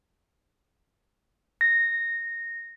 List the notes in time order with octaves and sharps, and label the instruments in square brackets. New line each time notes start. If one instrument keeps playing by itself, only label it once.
[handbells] A#6